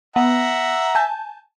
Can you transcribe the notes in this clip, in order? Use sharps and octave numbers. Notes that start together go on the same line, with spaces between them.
B3 E5 F#5 A#5
G#5 A5 G6